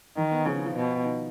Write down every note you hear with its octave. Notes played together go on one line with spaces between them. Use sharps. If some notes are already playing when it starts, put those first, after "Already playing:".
D#3 D#4
B3
C#3 F3
D#3
F3
B2
D#3